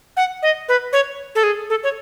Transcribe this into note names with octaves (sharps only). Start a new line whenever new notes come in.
F#5
D#5
B4
C#5
A4
G#4
A4
C#5